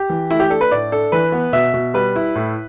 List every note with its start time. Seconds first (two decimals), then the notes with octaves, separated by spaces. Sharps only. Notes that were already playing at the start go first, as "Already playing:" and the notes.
Already playing: G4
0.10 E3
0.30 A3 E4
0.40 G4
0.50 D4 A4
0.61 B4
0.71 A2 D5
0.92 D4 A4
1.12 E3 B4
1.32 B3
1.53 B2 E5
1.74 B2
1.94 G3 B4
2.16 E4
2.35 A2